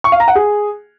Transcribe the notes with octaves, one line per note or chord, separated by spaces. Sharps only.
C#6
F5
A#5
F#5
G#4